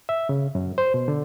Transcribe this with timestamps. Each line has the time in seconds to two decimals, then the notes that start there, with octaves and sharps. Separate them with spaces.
0.09 E5
0.29 C#3
0.55 F#2
0.78 C5
0.94 B2
1.08 D3